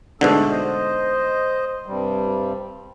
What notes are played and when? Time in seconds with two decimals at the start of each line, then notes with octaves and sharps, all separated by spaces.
0.21 G#2 B2 D3 A3 D4 A4
0.52 C5 D#5
1.86 G2 C3 G3